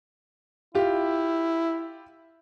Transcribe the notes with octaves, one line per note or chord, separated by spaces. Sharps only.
E4 F4 G4